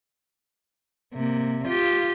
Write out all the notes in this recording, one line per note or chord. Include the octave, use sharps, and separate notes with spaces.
C3 A#3
F4 G4